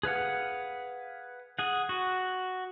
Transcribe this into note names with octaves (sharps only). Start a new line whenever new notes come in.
G#4 B4 F5 F#5
G#4 F#5
F#4